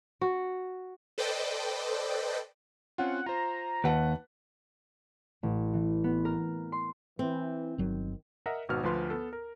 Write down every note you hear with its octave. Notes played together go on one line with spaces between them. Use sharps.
F#4
A4 B4 C5 D5 D#5 G5
C4 C#4 F4 F#5
F4 C5 A#5
D#2 B4 F#5 A5
A1
E3
B3
A#4
C6
E3 C4
G1 D#3 F#3
A#4 D#5 E5 F#5 A#5
G#1 B2 D#4 F#4 B4 F6
D2 F3 F4 B4 C6
B3 A4
A#4